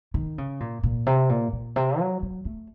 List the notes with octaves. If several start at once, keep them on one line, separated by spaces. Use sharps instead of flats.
D#3
C#3
A#2
A#2
C3
A#2
A#2
C3
F#3
F#3
A3